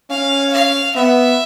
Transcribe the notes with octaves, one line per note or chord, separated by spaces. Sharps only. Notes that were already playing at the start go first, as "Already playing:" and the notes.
C#4 F5
F5
B3 E5